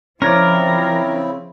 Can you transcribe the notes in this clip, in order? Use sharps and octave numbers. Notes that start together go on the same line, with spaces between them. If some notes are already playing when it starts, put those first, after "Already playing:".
C#3 F3 C4 C#4 E4 A#4 C#5 D5